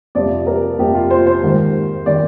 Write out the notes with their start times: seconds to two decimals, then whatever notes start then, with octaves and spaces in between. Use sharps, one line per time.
0.15 F2 C3 G3 D5
0.47 A#4
0.79 F2 C3 G3 G4
0.95 F4
1.11 C5
1.27 C5
1.43 G#2 D#3 G3
2.06 D#3 G3 D5